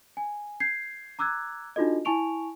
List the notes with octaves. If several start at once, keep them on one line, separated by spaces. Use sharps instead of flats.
G#5
G6 G#6 C7
A#5 D6 E6 F#6 G#6
D4 D#4 F4 F#4 A4 D#5
E4 G#5 A5 C#6 D7 F7